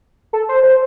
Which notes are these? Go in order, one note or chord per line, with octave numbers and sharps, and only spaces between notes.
A4
C5
C5